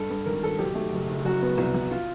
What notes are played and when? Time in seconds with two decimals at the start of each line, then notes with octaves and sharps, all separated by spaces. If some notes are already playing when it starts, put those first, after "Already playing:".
Already playing: G2 A4
0.10 G2
0.26 G#1 A#4
0.43 G#1 A4
0.59 B1 G4
0.75 A3
0.93 F#1
1.09 F#1
1.25 F#2 F#4
1.42 B3
1.58 C2
1.74 C2
1.91 F4